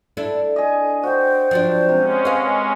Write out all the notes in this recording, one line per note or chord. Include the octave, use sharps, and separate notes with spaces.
D4 E4 A4
G#4 D#5
F#4 C5 G5
F3 F#3 D4
C3 G#3 C#4
B4 F5